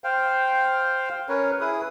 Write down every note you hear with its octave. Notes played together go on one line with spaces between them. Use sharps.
C5 F5 G5
C#4 A#4 B4 C#5
E4 G#4 B4 D#6